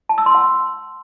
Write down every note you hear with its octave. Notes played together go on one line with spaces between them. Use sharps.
A5
E6
C6
F#5